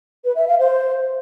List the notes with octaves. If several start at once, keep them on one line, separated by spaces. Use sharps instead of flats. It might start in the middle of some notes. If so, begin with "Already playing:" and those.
B4
E5
F5
C5